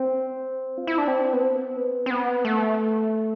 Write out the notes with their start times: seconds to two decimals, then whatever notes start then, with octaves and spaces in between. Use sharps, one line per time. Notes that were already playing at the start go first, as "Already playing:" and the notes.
Already playing: C4
0.78 F4
0.87 E4
0.98 D4
1.08 C4
1.33 B3
1.42 C4
1.76 B3
2.06 C4
2.11 B3
2.45 A3